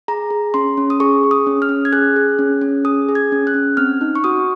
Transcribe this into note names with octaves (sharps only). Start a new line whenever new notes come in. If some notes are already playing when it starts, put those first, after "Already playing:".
G#4 A#5
G#4
C#4 C6
C#4
D#6
G#4 C#6
G#4
D#6
C#4
F6
C#4
G#6
G#4 F#6
G#4
C#4
C#4
G#4 D#6
G#4
G#6
C#4
F#6
C#4
C4 F6
D#4
C#6
F#4 D#6